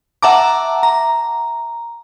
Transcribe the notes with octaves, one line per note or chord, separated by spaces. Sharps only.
E5 F#5 A5 A#5 D6
A#5